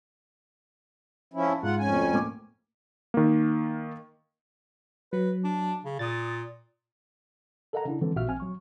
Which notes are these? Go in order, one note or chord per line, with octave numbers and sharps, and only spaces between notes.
F3 C#4 E4
A5
G#2 G#3 F4 F#5
F2 C#4 G#5
D2
A2 A#3 D6
D#3 A#3
F#3 B4
D4
C#3
A#2 D#6 A6
A4 A#4 D#5 F5 F#5 A#5
C#3 D4 E4
D3 E3 F3 G#3 C4
A#1 A#2 F#4 E5 F5 F6
A#1 C4 G#5 F6
F#3 C#6